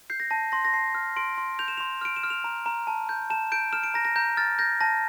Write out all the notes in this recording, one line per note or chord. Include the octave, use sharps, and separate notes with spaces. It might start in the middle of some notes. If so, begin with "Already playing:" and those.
G6 C7
A#6
A5 A#6
C6 A#6
A#6
A5 C7
F6
C6 D7
C6
G6 F7
E7
C6 F7
F6 D7
E7
F6
F7
A#5
A#5
A5
G6
A5 E7
G6 D7
F6 E7
D7
A#5 A#6
A#6
A#5 G6
F6 A6
G6 A#6
A5 A#6